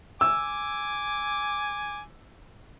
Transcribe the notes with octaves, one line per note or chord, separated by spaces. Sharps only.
G#5 D6 E6